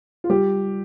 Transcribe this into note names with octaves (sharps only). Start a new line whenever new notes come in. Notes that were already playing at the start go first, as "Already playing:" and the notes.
F4
G3 G4